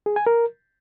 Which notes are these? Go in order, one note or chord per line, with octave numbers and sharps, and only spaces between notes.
G#4
G#5
A#4